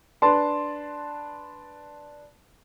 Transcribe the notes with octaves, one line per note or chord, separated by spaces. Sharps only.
D4 B4 A5 C6